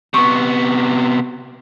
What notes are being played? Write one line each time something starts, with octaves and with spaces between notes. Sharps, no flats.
C3 B3 C#6